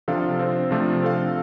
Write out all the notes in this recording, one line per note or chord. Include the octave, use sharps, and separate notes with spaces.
C3 F3 D4 A4 F5
C4 F4 C5
C3 F3 A3 D4 F4
C4 A4 F5